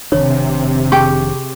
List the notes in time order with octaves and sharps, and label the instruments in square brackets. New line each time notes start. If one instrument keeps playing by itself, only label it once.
[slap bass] F1 D#3 D4 [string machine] C3 [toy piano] C#5
[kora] G4 [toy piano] G#4 G5 C#6